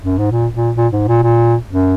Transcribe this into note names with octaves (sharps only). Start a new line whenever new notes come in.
F#2
G#2
A#2
A#2
A#2
G#2
A#2
A#2
F#2